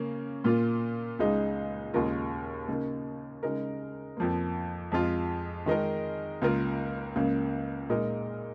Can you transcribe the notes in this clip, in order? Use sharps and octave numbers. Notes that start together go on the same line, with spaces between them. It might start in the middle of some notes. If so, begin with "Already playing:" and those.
Already playing: C#3 A#3 C#4
A#2 A#3 F4
C#2 C#3 G#3 D#4 G#4
D#2 C#3 G#3 F4 A#4
C#3 A#3 D#4
C#3 G#3 D#4 A#4
F2 F3 A#3
F2 F3 G#3 F4
D#3 G#3 D#4 A#4
C#2 C#3 A#3 F4 A#4
C#2 C#3 A#3
A#2 G#3 D#4 A#4